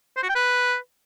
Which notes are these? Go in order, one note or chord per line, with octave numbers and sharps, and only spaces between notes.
C5
F#4
G5
B4